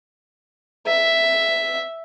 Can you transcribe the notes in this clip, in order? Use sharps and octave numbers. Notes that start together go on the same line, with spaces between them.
E5